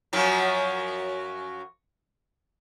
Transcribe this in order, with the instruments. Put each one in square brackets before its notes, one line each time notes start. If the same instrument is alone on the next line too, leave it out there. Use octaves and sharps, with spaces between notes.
[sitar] F#2 F3 F#3